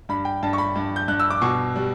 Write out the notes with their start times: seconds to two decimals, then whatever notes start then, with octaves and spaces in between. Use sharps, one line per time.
0.09 G2 B5
0.25 G5
0.43 G2 A5
0.53 C#6
0.58 B5
0.76 G2
0.96 G6
1.08 G2 F#6
1.19 E6
1.30 D6
1.41 B2 C#6
1.76 G3